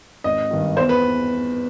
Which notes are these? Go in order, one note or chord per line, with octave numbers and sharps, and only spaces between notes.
G#1 D#5
G2 D#3
E2 C5
B4